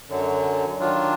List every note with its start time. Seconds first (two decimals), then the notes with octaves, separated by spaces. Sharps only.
0.09 F#2 D3 F#3
0.79 D#3 F#3 D4 F4